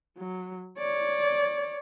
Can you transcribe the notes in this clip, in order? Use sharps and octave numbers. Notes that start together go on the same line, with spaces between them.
F#3
C#5 D5